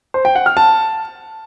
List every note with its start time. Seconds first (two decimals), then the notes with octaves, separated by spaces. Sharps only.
0.14 C5
0.25 G5
0.35 F#5
0.46 F6
0.57 A5